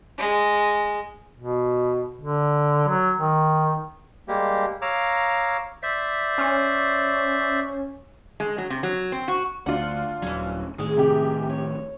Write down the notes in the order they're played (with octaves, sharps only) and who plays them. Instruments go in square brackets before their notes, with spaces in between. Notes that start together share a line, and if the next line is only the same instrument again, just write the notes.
[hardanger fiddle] G#3
[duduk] B2
D3
F#3
D#3
[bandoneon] G3 G#3 A#3 G4
C#5 F5 A#5 D6 E6
[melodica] C5 D5 E5 [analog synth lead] B6
[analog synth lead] C#4
[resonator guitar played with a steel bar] G#3
F#3
C3
F#3
C4
F#4
[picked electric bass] D2 [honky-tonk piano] D4 F4 [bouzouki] F#5
[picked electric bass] D#1 F#3 [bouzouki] E3 C#4
[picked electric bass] A2 D#3 [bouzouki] G#3 G#4
[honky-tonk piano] C3 G4
[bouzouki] C#5